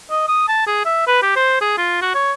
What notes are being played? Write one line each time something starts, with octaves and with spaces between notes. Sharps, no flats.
D#5
D#6
A5
G#4
E5
B4
G4
C5
G#4
F4
F#4
C#5